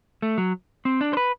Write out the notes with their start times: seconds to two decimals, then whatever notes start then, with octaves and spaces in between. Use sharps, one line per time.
0.22 A3
0.38 F#3
0.85 C4
1.01 D4
1.13 C5
1.17 B4